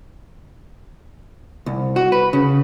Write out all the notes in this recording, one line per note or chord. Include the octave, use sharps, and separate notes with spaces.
C2
F#4
B4
C#3